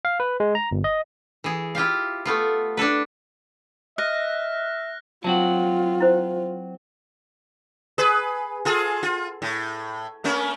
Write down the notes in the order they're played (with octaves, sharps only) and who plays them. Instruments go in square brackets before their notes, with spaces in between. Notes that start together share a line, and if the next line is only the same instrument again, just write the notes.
[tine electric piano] F5
B4
G#3
A#5
G1
D#5
[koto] E3 G#4
E4 F4 G4 F5
A3 B3 F4
D4 E4 A4 B4
[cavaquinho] D#5 [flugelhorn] E5 [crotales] F6 F#6 A#6
[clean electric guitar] F#3 C4 F#4 [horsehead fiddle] F4 [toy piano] A5
[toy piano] E4 C5
[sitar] G#4 B4
F4 G#4 A4
F4
A2
A3 A#3 C#4